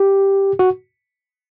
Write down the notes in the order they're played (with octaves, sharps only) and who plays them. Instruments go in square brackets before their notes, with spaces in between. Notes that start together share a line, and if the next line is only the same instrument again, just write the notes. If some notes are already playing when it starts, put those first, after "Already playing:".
Already playing: [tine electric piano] G4
F#4